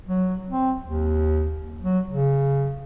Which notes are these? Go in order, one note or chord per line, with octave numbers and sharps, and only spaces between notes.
F#3
C4
D#2
F#3
C#3